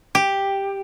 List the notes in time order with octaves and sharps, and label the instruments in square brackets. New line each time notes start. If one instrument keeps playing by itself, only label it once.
[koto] G4